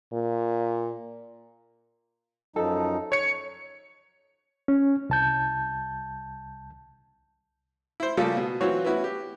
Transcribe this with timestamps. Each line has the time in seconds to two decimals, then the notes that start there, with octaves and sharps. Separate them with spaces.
0.13 A#2
2.56 F#2 F3 D#4 A4
3.12 C#5 C#6 C#7
4.68 C#4
5.10 C2 A5 G6
8.00 E4 C5
8.17 C#3 F3 G3 A#3 G4 A4
8.37 B2
8.61 E3 F#3 C4 F4 F#4 C#5
8.85 B3 C#4 E4 F#4
9.04 G4